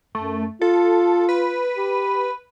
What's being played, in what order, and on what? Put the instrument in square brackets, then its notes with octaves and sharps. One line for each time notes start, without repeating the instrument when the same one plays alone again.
[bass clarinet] F#2 [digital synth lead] A3
[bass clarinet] F4 [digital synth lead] A4
[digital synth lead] B4
[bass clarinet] G4